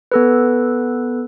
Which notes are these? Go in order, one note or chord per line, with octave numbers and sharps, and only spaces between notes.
B3 A4 B4